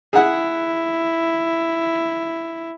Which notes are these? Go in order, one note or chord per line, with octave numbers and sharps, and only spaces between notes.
E4 G#4 F#5